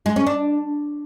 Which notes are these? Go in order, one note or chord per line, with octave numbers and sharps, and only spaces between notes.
G#3
C#4
D4